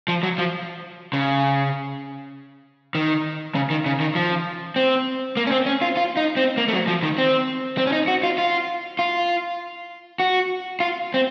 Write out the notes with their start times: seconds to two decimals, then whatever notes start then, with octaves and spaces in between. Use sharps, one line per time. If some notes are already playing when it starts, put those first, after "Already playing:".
0.08 F3
0.23 F#3
0.38 F3
1.13 C#3
2.95 D#3
3.55 C#3
3.70 D#3
3.86 C#3
4.00 D#3
4.15 F3
4.76 C4
5.37 A#3
5.47 C#4
5.51 C4
5.66 C#4
5.82 F4
5.97 F4
6.17 D#4
6.37 C4
6.57 A#3
6.68 A3
6.73 F#3
6.87 F3
7.03 D#3
7.18 C4
7.78 C4
7.87 C#4
7.92 D#4
8.08 F#4
8.23 F4
8.38 F4
8.99 F4
10.20 F#4
10.80 F4
11.14 C4